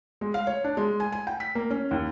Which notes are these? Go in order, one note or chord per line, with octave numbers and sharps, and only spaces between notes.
G#3
F5
C#5
D4
G#3
G#5
G#5
G5
B6
A#3
C#4
D#2